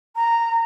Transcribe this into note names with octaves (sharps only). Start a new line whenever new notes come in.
A#5